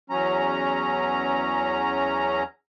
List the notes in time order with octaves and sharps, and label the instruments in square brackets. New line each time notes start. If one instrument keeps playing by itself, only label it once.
[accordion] E2 F#3 C#4 A#5